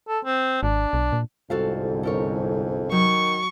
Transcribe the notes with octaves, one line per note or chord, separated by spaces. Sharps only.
A4
C4
G#1 D4
B1
A#2
G1 C2 F2 G#2 F#4 A4 F5
A4 A#4 C#5
D#3 F#3 C#6